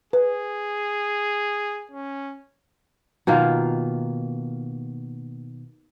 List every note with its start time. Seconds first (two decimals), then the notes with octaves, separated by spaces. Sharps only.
0.13 G#4 B4
1.91 C#4
3.27 B2 D#3 A#3 F4